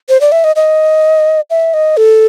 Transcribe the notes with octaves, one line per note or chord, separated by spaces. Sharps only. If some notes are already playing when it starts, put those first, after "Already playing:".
C5
D5
E5
D#5
D#5
E5
D#5
A4